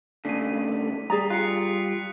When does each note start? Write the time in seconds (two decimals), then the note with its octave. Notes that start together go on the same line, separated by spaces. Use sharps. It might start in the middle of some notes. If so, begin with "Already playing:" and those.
0.25 D#2 C#3 A3 D4 B6 D#7
1.10 G3 G#4 D5 A#5 D#6 B6
1.30 F4 F#6 C#7